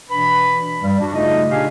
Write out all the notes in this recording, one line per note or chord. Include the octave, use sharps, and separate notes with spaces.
B2 E3 D4 B4 B5
G2 G3
D4 F#4
C#3 A3 D#4 F4 D#5
A#2 C#3 D4 G4 F5 G#5